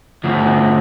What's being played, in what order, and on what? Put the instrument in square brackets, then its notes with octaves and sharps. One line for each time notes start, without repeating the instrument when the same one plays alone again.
[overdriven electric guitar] D2 F3